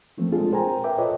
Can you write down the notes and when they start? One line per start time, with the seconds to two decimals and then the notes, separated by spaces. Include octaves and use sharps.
0.18 E3 F3 A3 A#3 C4
0.32 G#3 C4 D4 F4 G#4 A4
0.52 A#4 C5 G5 G#5 A#5
0.84 A#4 B4 E5 G5 D6
0.98 F4 A4 B4 C#5 D#5 E5